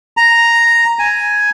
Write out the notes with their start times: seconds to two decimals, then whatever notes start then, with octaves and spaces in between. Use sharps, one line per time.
0.17 A#5
0.99 G#5